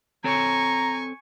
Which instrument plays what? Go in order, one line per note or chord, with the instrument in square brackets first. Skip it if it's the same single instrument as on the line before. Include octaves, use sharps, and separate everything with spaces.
[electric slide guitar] C4 A4 C#5 [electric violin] G#5 C#6 [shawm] A#5